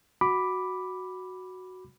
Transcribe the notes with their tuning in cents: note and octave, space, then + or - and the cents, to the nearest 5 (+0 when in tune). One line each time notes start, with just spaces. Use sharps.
F#4 +0 B5 +0 D6 +0